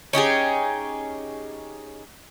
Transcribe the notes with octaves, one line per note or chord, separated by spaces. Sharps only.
C#4 D#4 G4 G#4